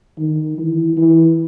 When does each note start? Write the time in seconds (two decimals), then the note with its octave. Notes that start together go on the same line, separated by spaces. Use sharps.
0.18 D#3
0.58 E3
0.97 E3